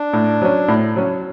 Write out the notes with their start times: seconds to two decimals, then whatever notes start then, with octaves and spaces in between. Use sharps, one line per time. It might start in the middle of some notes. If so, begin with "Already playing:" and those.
Already playing: D4
0.13 A2
0.42 F#3 C#4
0.68 A2
0.96 F#3 C#4